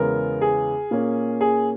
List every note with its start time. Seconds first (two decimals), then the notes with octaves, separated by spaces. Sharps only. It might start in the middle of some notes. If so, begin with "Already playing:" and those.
Already playing: E2 C#3 G#3 B3 A#4
0.41 G#4
0.91 A#2 A#3 C#4
1.41 G#4